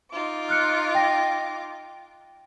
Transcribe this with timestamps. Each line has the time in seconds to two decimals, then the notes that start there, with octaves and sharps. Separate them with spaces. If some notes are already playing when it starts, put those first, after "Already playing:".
0.11 D#4 F4 D6
0.49 F6 F#6 C#7
0.95 G5 A#6